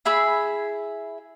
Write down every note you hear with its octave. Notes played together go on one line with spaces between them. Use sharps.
E4 G#4 B5 E6